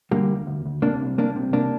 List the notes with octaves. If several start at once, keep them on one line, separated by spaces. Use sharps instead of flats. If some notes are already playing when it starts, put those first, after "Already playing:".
D3 G3 A#3
D2
D2
D2
C3 A#3 D4
C2
C2 A#3 D4
C3
C2 A#3 D4